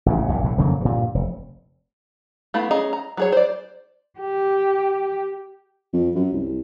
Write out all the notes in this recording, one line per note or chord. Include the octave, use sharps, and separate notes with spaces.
A1 G#2 C#3
B1 G2 A#2
B1 A2 D3
F2 C#3 F#3 A#3
G2 A#2
F1
A3 B3 E4 F5 B5
C#4 G#4 D#5 A#5
A#5
F#3 G#4 C#5
C5 D5
G4
F2
F#2
C2